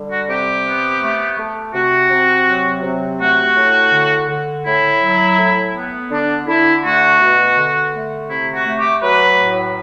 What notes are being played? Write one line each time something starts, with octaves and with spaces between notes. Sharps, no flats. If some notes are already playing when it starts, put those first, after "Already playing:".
Already playing: D3 G3
F#4
C3 G4
B3
A3
A3
C3 F#4
C3
F#3
C3
A3 F#4
A2
D3
D3
A2 E4
F#3
A2
B3
D3 D4
D3 E4
A3 F#4
B2
D3
A3
C3 E4
F#4
A3
G4
F#3 B4
A2